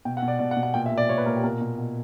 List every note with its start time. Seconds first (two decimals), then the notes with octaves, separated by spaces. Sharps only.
0.05 B2 G5
0.17 F#5
0.22 B2
0.28 D5
0.39 B2 D5
0.51 F#5
0.57 B2
0.63 F#5
0.74 A#2 G5
0.86 E5
0.92 A#2
0.98 D5
1.09 A#2 C#5
1.18 B4
1.26 A#2 A#4
1.36 G4
1.44 B2 A#4
1.61 B2
1.78 B2